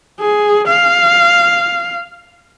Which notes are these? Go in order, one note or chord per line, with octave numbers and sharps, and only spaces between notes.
G#4
F5